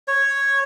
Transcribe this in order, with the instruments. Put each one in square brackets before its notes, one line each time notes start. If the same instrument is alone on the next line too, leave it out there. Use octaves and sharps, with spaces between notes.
[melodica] C#5